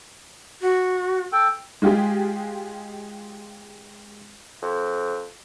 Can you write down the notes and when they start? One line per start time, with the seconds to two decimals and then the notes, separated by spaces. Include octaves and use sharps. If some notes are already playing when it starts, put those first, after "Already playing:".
0.62 F#4
1.33 A4 G5
1.82 G#3 F4 G4 G#4
4.62 F2